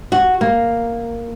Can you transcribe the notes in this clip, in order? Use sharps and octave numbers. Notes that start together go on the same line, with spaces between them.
F#4
A#3